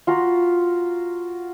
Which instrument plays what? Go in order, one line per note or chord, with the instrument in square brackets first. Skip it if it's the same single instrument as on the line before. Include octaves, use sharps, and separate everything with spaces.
[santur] F4 F#4 A#5 B5